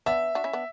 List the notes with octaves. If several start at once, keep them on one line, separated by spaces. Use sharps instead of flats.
B3 D4 E5
D4 F#4
C#4 E4
B3 D4